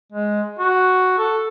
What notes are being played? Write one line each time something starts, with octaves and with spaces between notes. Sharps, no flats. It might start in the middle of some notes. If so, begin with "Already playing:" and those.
G#3
F#4
A4